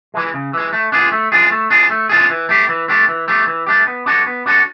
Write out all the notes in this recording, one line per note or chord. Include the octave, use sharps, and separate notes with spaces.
E3 G#3
C#3
E3 G#3
A3
D4 F4 G#4
A3
D4 F4 G#4
A3
D4 F4 G#4
A3
D4 F4 G#4
E3
A3 D4 G4
E3
A3 D4 G4
E3
A3 D4 G4
E3
A3 D4 G4
B3
D4 F#4 A4 C#5
B3
D4 F#4 A4 C#5